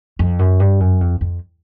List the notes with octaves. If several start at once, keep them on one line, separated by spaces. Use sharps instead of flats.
F2
F#2
G2
F#2
F2
F2